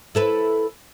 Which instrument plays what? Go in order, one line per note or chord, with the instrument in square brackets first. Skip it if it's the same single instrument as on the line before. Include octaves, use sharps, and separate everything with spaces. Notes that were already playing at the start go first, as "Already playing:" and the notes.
[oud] E4 A4 B4